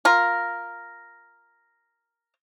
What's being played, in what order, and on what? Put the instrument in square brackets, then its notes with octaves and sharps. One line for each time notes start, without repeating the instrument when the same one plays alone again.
[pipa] F4 A#4